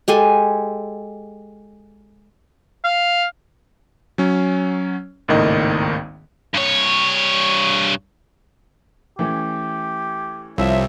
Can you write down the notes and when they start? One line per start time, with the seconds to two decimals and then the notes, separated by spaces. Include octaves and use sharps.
0.08 G#3 G4 A4 G#5
2.84 F5
4.18 F#3 C#4
5.28 G#1 C#2 A2 D#3 A#3 D#5
6.54 G2 C#5
9.19 E3 A3 C#4 G4
10.58 C2 F3 C#5 E5